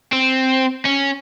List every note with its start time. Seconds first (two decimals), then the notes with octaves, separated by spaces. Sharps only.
0.12 C4
0.85 C#4